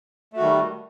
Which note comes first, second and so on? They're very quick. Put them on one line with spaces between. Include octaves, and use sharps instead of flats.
A3 F#4 D#3 G3